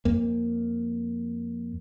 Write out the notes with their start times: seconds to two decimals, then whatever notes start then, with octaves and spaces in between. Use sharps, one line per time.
0.05 F2 A#3